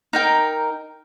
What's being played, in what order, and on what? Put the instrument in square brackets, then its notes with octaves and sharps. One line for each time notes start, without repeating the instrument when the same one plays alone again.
[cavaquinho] D#4 A#4 G5